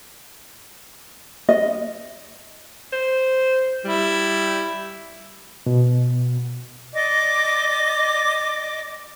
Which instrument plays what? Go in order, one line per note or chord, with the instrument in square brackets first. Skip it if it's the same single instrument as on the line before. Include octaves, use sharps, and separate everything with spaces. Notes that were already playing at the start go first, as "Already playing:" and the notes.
[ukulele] D#5
[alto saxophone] C5
[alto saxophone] G3 [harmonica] E4
[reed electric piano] B2
[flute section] D5 D#5 D6